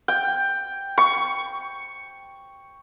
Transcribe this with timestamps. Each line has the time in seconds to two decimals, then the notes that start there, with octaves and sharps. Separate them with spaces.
0.08 G5
0.98 C#6